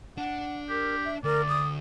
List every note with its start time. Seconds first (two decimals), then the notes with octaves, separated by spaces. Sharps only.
0.18 D4 F#5
0.69 G4 A#4
1.05 E5
1.24 D2 A#4 D5
1.48 D#6